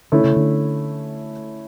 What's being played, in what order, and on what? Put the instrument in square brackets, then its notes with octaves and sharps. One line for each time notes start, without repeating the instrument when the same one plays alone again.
[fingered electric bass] D3 [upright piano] A3 C#4 E4
[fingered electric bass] C#3
D3